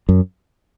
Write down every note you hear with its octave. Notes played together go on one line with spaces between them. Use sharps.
F#2